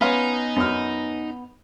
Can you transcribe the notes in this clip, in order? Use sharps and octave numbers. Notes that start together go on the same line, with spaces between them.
B3 C#4 D#4 B4 F5 G#5 C6 B6
F#2 F6